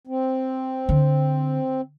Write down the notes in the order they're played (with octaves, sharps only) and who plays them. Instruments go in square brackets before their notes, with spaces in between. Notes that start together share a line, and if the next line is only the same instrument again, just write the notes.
[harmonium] C4
[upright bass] D3